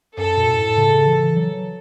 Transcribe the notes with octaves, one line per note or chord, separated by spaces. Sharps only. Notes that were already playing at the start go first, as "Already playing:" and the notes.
F#2 A4
B2
A2
C#3
E3
F#3